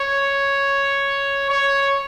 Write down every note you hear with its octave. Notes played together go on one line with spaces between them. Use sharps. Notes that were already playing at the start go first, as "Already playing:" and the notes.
Already playing: C#5
C#5